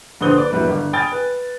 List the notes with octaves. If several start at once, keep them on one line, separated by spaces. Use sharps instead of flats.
A#1 D3 B4 C5 D#6 G7
B4 D5
E1 F#3 G3 E4 B4
G1
G5 G#5 B5 D#6 F6 A6
B4